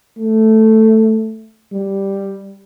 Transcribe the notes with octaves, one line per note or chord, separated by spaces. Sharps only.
A3
G3